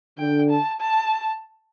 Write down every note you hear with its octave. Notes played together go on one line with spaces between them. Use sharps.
D3 G5
A5
A5